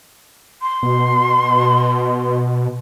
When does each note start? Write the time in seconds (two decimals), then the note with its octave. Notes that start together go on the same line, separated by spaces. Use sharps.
0.62 C6
0.83 B2